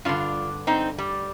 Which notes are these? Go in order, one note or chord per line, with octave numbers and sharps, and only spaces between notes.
G2 D3 D4 F4
C4 D#4
G3